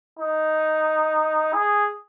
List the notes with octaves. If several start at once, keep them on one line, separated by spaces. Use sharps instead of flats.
D#4
G#4